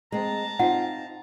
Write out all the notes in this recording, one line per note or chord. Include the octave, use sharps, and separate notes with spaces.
G#3 C4 A5 A#5
C4 D#4 F4 F#5